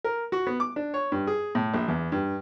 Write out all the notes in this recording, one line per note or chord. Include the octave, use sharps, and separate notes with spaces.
A#4
F#4
B3
D6
D4
C#5
G2
G#4
A2
A#1
E2
G2